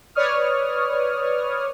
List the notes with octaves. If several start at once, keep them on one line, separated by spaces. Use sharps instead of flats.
B4 C#5 D5 C#6 D#6 F6